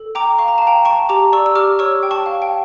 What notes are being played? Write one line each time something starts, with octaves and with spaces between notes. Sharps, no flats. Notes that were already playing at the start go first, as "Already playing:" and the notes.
Already playing: A4
G5 A#5 D6
F5 C#6
A#5
F5 A5
G5 A#5
G5 A5 C#6
G4 A#5 D6
D5 C#6 E6
E6
G4 D6 F6
C#5 C#6 E6
G5
A5 C#6
F5
G5